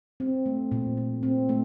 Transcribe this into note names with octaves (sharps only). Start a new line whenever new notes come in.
C4
A3
A#2
A#2
C4
A3